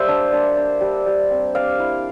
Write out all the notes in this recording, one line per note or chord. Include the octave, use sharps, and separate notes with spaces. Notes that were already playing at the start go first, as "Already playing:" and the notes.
Already playing: G3 A#3 C5 D5 E5
D4
D4
D4
G3
G3
C4
C4 D5 F5
E4